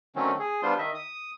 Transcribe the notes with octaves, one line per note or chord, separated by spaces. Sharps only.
D3 D#3 F#3 A3 C4 C#4
G#4
G3 B3 D4 F4 C5 C6
D#3 D#5 E5
D#6